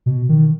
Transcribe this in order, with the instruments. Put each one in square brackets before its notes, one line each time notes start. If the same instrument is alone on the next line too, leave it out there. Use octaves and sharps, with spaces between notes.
[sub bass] B2
D#3